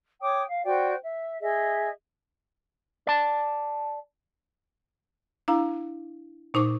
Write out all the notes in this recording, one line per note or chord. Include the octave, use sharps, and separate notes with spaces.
C#5 G5 D6 D#6
F5
F#4 C5 D5 G5
E5
G#4 D#5 E5
D5 A5
D4 E4 F5 A#5
A#2 D#4 C5 C#6 D6